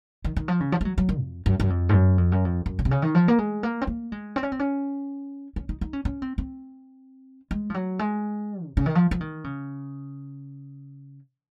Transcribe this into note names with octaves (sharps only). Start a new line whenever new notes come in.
D#3
D#3
F3
C#3
F3
G#3
F#3
F#3
D#3
F2
F#2
F#2
F2
G#2
F#2
F2
F#2
F2
F#2
C#3
C3
C#3
D#3
F3
A#3
G#3
A#3
C4
A#3
G#3
C4
C#4
C4
C#4
C#4
D#4
D#4
C#4
C#4
C4
C4
G#3
F3
F#3
G#3
C3
C#3
D#3
F3
F3
D#3
C#3